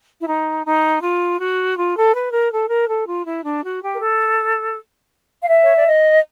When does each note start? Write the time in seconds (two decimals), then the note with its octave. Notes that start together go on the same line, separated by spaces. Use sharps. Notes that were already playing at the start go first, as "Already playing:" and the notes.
0.19 E4
0.26 D#4
0.64 D#4
1.01 F4
1.37 F#4
1.75 F4
1.95 A4
2.13 B4
2.31 A#4
2.51 A4
2.68 A#4
2.87 A4
3.06 F4
3.24 E4
3.43 D4
3.62 F#4
3.81 G4
3.94 A#4
3.99 A4
5.42 F5
5.48 E5
5.63 C#5
5.75 D5
5.86 D#5